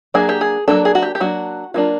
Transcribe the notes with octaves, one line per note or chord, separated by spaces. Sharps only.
F#3 A#3 D4 G#4
G4
G#4
F#3 A#3 D4 A4
G#4
F#4
G4
G4
F#3 A#3 D4 F#4
F#3 A#3 D4 F4